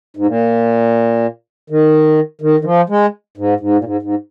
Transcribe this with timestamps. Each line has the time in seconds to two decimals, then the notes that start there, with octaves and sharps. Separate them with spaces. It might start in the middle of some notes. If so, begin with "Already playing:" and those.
0.17 G#2
0.26 A#2
1.70 D#3
2.41 D#3
2.60 D#3
2.65 F3
2.89 G#3
3.37 G#2
3.60 G#2
3.77 A#2
3.84 G#2
4.02 G#2